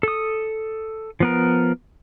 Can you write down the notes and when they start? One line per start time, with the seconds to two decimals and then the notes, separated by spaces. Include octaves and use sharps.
0.03 A4 D#6
1.20 F3 B3 A#4